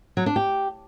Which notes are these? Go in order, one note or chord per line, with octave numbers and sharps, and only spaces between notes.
F#3
D4
G4